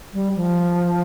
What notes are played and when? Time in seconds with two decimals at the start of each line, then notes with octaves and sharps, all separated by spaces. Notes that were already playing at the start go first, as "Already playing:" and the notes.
0.14 G3
0.36 F3